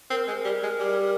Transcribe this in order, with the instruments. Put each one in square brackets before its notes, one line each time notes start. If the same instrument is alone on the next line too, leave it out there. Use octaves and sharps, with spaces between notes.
[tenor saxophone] C4 [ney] A#4
[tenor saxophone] G#3
[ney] A#4
[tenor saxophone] G3
G#3
G3